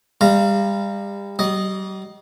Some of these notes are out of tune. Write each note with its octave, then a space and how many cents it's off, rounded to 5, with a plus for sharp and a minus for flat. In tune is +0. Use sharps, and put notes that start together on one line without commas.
G3 +30 F5 -20 A#5 +0
G3 -45 D#5 -5